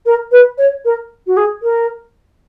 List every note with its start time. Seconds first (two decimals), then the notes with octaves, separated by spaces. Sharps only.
0.06 A#4
0.32 B4
0.58 C#5
0.85 A#4
1.27 F#4
1.37 G#4
1.63 A#4